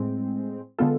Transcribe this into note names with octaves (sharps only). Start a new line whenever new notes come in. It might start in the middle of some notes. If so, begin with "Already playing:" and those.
Already playing: A2 G#3 C4
D3 G#3 B3 F4 A4